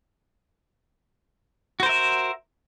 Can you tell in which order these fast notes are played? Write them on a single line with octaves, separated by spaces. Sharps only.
F#4 C5 A#4 E5